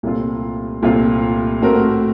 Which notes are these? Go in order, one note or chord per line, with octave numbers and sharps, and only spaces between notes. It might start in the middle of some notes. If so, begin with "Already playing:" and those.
C2 A#2 A3 C4 F4
C2 A#2 A3 C4 F4
A2 A3 C4 F#4 A#4